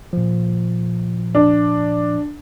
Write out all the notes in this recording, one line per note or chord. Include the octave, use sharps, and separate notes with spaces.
A#2 F3
D4